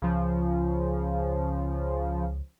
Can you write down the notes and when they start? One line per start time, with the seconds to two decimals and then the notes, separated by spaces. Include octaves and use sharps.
0.02 C#2 C#3 F3